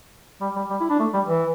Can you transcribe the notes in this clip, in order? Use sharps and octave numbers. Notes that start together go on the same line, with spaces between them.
G3
G3
G3
E4
D4
A3
G3
E3